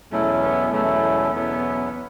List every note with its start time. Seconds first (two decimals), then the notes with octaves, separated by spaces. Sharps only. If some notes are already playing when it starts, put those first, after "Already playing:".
0.11 E2 B2 F#3 A3 C#4 E4
0.42 B3
0.71 E2 B2 F#3 A3 C#4 E4
1.32 E2 B2 F#3 B3 C#4 E4